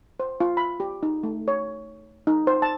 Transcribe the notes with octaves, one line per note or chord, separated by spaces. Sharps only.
C5
F4
B5
G4
D#4
A3
C#5
D#4
C5
A5